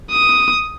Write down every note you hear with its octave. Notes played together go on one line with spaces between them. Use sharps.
D#6